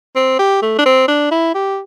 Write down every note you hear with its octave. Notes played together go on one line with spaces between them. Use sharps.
C4
G4
A3
D4
C4
D4
E4
G4